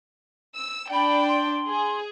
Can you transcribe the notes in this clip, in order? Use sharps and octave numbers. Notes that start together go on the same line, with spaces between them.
E6
D4 D5 G5 B5
C6
G#4